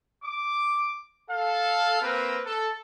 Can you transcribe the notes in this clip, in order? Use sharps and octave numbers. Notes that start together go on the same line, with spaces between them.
D6
A4 F5
A#3 C4 A#4 B4
A4